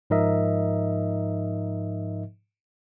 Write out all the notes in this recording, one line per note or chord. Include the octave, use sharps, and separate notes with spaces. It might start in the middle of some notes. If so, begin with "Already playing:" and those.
G#2 F3 D#4 A#4 D#5 E5